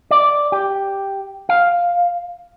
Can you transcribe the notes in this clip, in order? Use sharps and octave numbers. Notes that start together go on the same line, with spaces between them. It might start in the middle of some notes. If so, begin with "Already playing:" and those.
D5
G4
F5